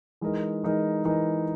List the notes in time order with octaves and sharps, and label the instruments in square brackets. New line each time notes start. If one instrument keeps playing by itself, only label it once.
[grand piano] E3 G#3 D#4 A#4 D#5
E3 G#3 D#4 A#4 D#5
E3 G#3 D#4 A#4 D#5